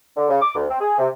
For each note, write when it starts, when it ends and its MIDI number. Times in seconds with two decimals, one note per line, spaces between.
0.17 0.30 50
0.30 0.39 49
0.42 0.54 86
0.55 0.66 38
0.69 0.79 60
0.81 0.97 68
0.98 1.08 48